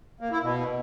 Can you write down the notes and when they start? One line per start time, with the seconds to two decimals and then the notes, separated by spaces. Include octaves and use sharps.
0.21 A#3
0.31 E4
0.42 B2